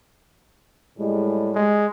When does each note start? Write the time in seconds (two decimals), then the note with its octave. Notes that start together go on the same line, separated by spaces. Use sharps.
0.97 A2 G3 G#3
1.55 G#3